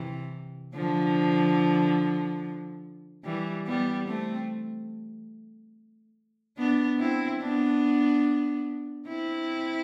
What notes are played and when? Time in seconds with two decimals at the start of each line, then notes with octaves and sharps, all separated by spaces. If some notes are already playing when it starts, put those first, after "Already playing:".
Already playing: C3 E3
0.75 D3 F3
3.25 E3 G3
3.67 G3 B3
4.08 A3 C4
6.58 B3 D4
6.99 C4 E4
7.41 B3 D4
9.08 C4 E4